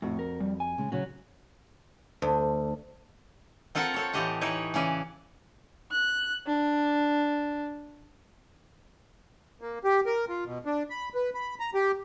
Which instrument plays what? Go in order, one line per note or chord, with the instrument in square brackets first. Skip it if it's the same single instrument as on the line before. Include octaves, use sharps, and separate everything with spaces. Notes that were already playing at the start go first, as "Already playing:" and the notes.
[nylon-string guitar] F2 F#4 [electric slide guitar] A2
[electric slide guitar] A#4
G3
G#5
[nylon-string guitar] C#3 G#3
[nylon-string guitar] C#3 C#4 [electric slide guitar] F#3
[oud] D2
[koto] C4 F4 A4 A#4 F#5
C4 A4 C#5
A2 E3 C4 G4 D#5 F#5
E3 D#4 E4 B4 C#5
C#3 E3 C#4 D5
[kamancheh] F#6
D4
[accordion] A#3
G4
A#4
F4
B2
D4
B5
B4
B5
A#5
G4